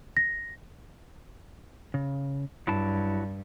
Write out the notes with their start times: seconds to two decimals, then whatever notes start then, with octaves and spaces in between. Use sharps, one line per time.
0.17 A#6
1.94 C#3
2.67 G2 F#3 E4 A5